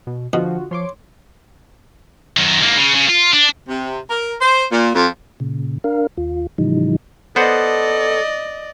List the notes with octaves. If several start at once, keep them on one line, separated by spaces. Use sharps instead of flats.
B2
B2 D3 F3 F4 F#4
F3 C#5 C6 D6
F#2 D#3
G#2 A#3
C#3
C#3
F4
D4
C3
A#4
C5
A#2
F2
A#2 C#3
D4 A#4 F5
D#2 F4
A2 C#3 E3 F3 G3 D#4
B3 A4 C5 D5 D#5 F#5